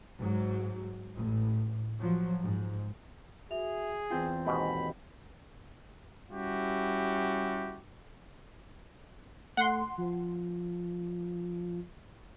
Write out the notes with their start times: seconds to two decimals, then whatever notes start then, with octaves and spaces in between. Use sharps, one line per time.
0.19 G#2 F#3
1.15 A1 A2
2.00 F3 F#3
2.42 G#2
3.51 F#4 G#4 E5 F7
4.10 E2 C4 F4 G5 C6 G6
4.46 D#2 G#2 B2 B5
6.31 G3 C#4 E4 F#4 G4
9.57 A3 F#5 C6
9.98 F3